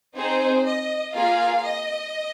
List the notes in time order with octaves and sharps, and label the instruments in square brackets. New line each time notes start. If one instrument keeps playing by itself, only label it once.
[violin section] C4 D#4 G#4 C5
D#5
A#3 F4 G#4 F5
D#5